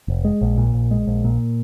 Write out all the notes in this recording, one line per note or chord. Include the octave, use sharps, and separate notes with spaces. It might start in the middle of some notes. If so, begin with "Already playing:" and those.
F1
G#3
A#1
A#2
A#1
G#3
A#1
A#2